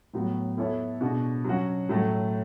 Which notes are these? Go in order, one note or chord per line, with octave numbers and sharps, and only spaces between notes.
A2 F#3 B3 F#4
B3 E4 A4 C#5 E5
B2 G#3 D4 F#4
F#3 C#4 F#4
A2 F#3 A3